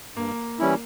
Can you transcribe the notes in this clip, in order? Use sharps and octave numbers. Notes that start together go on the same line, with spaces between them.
G2 A#3
E3 G3 C#4 E4